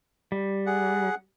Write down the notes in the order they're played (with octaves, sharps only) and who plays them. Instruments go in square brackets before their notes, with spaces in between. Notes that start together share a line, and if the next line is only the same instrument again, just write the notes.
[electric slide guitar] G3
[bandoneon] G#4 F#5